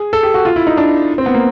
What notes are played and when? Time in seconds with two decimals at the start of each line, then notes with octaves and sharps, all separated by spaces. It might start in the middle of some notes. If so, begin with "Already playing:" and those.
Already playing: G#4
0.13 A4
0.23 G4
0.34 F#4
0.45 F4
0.56 E4
0.67 D#4
0.77 D4
1.18 C4
1.26 B3
1.34 A#3